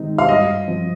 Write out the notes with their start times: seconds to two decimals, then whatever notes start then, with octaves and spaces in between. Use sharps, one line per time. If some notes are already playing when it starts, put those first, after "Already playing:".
Already playing: G2 D#3 G#3 C4 D#4
0.18 F5
0.29 G2 D#5
0.68 F3 C4